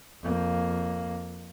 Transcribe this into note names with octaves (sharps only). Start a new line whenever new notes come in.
F2 A#3